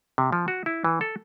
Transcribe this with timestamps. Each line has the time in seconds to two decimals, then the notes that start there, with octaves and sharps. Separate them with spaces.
0.18 C3
0.32 F3
0.48 F#4
0.66 E4
0.84 E3
1.01 A4